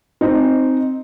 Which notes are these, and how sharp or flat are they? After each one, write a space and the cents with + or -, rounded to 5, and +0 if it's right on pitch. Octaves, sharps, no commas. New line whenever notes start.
C4 +0 D#4 +0